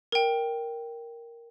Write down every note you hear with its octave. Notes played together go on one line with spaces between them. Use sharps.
A#4 G5